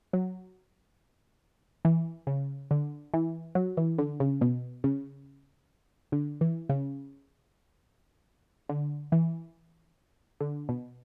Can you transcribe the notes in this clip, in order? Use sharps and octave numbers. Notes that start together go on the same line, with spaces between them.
F#3
E3
C#3
D3
E3
F#3
E3
D3
C#3
B2
C#3
D3
E3
C#3
D3
E3
D3
B2